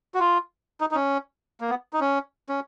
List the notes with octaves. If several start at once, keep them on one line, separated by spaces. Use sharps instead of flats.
F#4
F4
D#4
D#4
C#4
A#3
B3
D#4
C#4
C#4